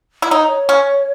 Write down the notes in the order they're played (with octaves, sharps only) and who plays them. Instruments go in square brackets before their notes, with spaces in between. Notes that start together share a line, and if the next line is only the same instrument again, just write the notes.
[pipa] E4
[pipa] D#4 [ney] C#5
[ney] D#5
C#5
[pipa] C#4